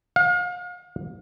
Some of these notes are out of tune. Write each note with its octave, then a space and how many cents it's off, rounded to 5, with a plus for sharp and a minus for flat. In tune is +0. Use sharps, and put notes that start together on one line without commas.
F5 +40